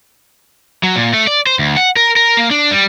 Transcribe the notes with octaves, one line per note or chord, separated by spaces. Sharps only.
F#3
A#2
A3
D5
C5
D2
F#5
A#4
A#4
A#3
D4
G3